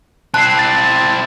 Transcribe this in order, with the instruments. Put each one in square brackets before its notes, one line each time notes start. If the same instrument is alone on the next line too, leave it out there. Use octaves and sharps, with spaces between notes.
[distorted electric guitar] C4 E4 [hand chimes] A5 [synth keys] F#6 C7
[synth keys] A6